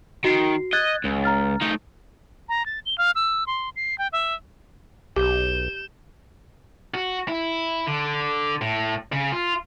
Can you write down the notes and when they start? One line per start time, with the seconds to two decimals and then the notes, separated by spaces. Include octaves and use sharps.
0.24 D#3 F#4 C7
0.73 D#5 F#6 G#6 A6
1.04 C#2
1.23 A#5 F6 A6
1.62 A3 D#4
2.49 A#5
2.66 A6
2.86 G7
2.98 F5
3.15 E6
3.47 C6
3.76 C7
3.98 G5
4.12 E5
5.16 B1 G4 G6 E7
6.94 F#4
7.28 E4
7.87 D3
8.61 A2
9.12 C#3
9.32 F4